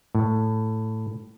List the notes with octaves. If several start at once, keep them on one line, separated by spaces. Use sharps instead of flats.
A2